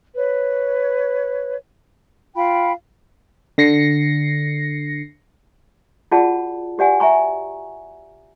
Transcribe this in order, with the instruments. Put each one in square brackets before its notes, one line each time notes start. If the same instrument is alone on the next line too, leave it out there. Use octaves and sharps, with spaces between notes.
[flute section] B4 C#5
F4 F5 G5 B5
[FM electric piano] D3 A#6 C7 C#7
[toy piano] F4 F#4 G#4 D5 F#5 A5
F#4 G4 D5 F#5 G#5
E5 G#5 A#5 C#6